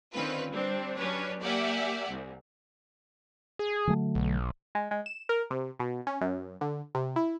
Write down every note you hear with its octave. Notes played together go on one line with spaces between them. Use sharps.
D3 D#3 C4 C#4 F4 B4
G3 C4 D4
F#3 C#4 D4 G4 B4 C#5
A#3 G4 D5 E5 F#5 G#5
C2
G#4
D3 F#3 A3
B1
G#3
G#3
E7
A#4
C3
B2
C#4
F#2
D3
C3
E4